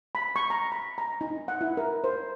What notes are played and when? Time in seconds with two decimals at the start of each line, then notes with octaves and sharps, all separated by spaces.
0.15 B5
0.36 C#6
0.50 A#5
0.72 B5
0.98 A#5
1.21 D#4
1.48 F#5
1.61 E4
1.77 A#4
2.04 C5